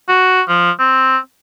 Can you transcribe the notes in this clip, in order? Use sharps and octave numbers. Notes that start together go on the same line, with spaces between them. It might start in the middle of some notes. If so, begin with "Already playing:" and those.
F#4
F3
C4